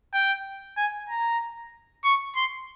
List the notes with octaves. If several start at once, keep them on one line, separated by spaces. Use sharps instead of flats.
G5
G#5
A#5
C#6
C6